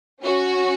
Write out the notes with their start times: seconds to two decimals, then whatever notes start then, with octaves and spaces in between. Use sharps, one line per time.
0.22 C#4 F#4